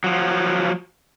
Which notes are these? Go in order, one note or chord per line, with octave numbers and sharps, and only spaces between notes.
F3 F#3